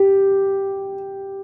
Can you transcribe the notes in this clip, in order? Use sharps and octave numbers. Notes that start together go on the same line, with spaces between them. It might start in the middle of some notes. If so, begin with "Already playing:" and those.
Already playing: G4